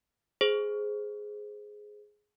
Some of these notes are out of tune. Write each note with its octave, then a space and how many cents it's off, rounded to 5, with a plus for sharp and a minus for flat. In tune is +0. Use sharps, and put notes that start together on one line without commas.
G#4 +5 C5 +0